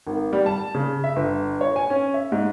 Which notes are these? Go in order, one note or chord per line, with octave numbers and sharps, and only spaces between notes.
G#1
G3
A5
C#3
E5
G1
C#5
G#5
C#4
E5
G#2